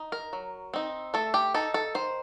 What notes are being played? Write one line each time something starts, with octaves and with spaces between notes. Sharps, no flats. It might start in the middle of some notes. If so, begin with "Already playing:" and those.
Already playing: D#4
A#4
F#3
C4 D#4
A3 A4
G4
D#4 A4
A4
D#3 C5